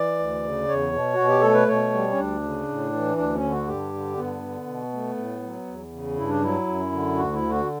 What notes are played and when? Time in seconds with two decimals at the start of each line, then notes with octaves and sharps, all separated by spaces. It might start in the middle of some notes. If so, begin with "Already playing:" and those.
Already playing: E3 D5
0.19 D2
0.44 C#3
0.68 E2 C#5
0.93 B2
1.14 B2 F#4
1.28 G4
1.41 A3 A4
1.54 B4
1.68 B2 C#5
1.93 G3
2.12 C#4
2.17 D2 D4
2.43 C#3
2.68 A2
2.93 E3
3.17 D2 D4
3.35 C#4
3.43 D3
3.51 F#4
3.68 G2 G4
3.93 D3
4.17 G2 B3
4.42 D3
4.67 B2
4.93 A3
5.17 A2
5.42 F#3
5.67 E2
5.92 C#3
6.17 G2 E4
6.30 D4
6.42 F#3 E4
6.67 F#2
6.92 D3
7.17 D2 F#4
7.33 E4
7.42 D3
7.50 F#4